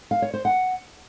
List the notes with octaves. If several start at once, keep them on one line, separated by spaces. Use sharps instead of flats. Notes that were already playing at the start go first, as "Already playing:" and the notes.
F5
C#5
C5
F#5